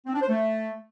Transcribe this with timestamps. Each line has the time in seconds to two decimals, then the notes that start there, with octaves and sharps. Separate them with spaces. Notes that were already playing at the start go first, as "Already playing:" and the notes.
0.06 C4
0.14 D4
0.21 C5
0.29 A3